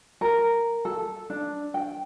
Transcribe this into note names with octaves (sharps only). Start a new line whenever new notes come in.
A#4
A4
D4
G5